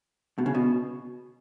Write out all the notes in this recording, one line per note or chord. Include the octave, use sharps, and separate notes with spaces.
B2
C#3
B2